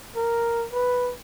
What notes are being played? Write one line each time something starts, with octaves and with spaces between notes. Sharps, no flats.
A#4
B4